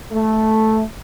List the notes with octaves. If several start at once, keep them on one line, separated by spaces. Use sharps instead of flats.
A3